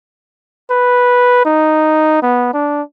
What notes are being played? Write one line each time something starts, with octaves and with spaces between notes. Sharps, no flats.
B4
D#4
B3
D4